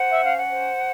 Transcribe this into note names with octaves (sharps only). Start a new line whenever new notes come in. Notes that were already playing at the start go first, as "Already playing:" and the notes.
Already playing: C5 F#5
E5
C#4 F5
F#5
C5